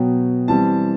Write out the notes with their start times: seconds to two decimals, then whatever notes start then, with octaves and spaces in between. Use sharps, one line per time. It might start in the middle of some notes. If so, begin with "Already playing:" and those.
Already playing: B2 F#3 B3 G5
0.48 E3 G3 C4 A5